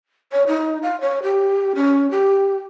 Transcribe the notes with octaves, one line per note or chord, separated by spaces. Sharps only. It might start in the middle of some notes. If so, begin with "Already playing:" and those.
C#5
D#4
F5
C#5
G4
C#4
G4